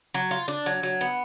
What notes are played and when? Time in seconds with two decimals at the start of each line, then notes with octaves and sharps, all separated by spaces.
0.14 F#3
0.31 F4
0.48 D4
0.66 F#3
0.83 F#3
1.01 B3